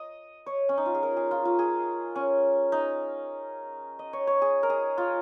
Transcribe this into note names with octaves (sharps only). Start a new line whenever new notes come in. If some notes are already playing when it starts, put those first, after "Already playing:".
Already playing: D#5
C#5
C#4
D#4
F4
G#4
A#4
G#4
F4
F4
G#4
C#4
D#4
D#5
C#5
C#5
G#4
A#4
G#4
F4